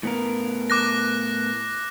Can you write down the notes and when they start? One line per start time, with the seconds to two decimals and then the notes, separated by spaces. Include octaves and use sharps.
0.03 A2 B3 A#4
0.70 D6 F#6 A#6